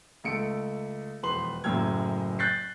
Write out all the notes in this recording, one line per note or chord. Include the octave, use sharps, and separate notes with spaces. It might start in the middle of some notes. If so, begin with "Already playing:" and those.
C#2 A3 C#7 D7
E1 F2 B4 C6 F#7
F#1 F#2 A2 G5 F6 G#6
F#6 G6 A6 B6 C7